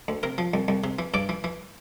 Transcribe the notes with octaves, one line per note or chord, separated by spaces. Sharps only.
D2
C3 A#4
F3
C2
C2
C3
E3
G2 D5
E3
E3